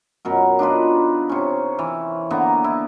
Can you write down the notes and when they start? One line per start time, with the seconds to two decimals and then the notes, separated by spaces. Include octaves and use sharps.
0.25 F#2 B2 A#4
0.59 D4 D#4 F4 B4
1.29 C3 C#4
1.79 E3
2.30 D3 A#3 B3 A#5
2.64 E4